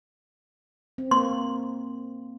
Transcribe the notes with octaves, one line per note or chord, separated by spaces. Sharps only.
C4
A#3 C6